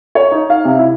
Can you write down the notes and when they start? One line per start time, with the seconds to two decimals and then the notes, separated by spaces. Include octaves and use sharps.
0.15 C#5
0.32 D#4
0.50 F5
0.65 C3
0.79 E4